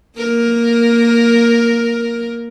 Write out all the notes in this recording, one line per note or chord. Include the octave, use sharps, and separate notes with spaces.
A#3 A#4